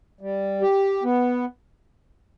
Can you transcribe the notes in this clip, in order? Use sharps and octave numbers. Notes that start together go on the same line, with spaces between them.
G3
G4
B3